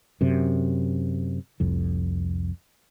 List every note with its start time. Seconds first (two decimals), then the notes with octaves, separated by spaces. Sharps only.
0.21 F#2 C3
1.60 F1 C2 F2